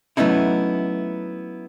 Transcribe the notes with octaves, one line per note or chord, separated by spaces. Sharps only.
F#3 A3 B3 C#4 D#4 E4